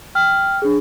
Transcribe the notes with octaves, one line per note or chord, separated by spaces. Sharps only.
G5 F6
D4 G#4